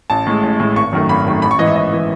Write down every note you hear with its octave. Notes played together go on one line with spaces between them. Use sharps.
A1 A5
A2 G#3
A1
A2 G#3
G#1 C#6
F#2 D#3 A3
G#1 B5
F#2 D#3 A3
A1 B5
C#6
G#2 E3 D#5
E5
A1 D#5
E3